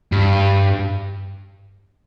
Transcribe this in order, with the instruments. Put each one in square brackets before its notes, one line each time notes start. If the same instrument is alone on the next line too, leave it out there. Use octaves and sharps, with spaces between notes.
[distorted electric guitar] G2